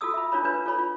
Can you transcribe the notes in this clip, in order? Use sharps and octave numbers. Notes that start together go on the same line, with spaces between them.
F4 F#4 A4 D#6 E6
E5 B5
D4 F4 A#4 C#5 B5
D4 F4 B4 C#5
F4 A4 C#5 B5
F4